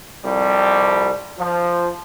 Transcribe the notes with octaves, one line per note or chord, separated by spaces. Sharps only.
C2 F2 G3
F3